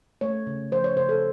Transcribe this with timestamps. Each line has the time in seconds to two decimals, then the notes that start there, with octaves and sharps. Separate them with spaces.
0.21 A3 C#5
0.47 C#3
0.72 F3 C5
0.84 C#5
0.97 C#3 C5
1.09 A4